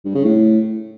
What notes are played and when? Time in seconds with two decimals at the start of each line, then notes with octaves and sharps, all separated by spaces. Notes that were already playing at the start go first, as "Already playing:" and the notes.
0.05 G2
0.15 C#3
0.25 A2